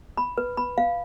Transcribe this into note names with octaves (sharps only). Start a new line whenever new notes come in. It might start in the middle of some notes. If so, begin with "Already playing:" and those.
B5
B4
B5
F5